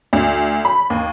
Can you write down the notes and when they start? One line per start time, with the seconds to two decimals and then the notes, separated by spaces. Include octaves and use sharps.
0.13 D2
0.65 B5
0.90 D#2